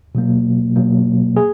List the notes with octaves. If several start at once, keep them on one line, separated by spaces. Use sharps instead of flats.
B2 F#3 A#3
B2 F#3 A#3
G#4